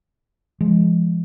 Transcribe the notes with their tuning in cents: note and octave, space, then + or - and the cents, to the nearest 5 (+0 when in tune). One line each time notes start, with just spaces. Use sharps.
F3 -35 G#3 +0